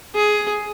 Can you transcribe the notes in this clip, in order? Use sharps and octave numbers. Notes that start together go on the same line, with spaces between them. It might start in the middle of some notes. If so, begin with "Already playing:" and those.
G#4